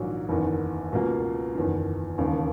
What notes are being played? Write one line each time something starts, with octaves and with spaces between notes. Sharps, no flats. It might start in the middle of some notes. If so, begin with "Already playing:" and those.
Already playing: A#1 G#2 D#3 F#3
F#1 E2 D#3
C#2 B2 A#3
F#1 E2 D#3
E1 D#2 C#3